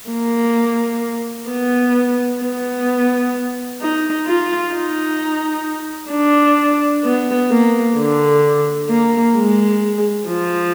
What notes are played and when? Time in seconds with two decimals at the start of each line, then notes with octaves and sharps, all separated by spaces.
0.11 A#3
1.49 B3
2.42 B3
3.81 D#4
4.27 F4
4.74 D#4
6.11 D4
7.05 B3
7.51 A#3
7.97 D3
8.89 A#3
9.36 G#3
10.27 F3